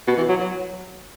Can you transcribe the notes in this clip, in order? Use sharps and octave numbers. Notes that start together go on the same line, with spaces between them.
B2
E3
F#3
F#3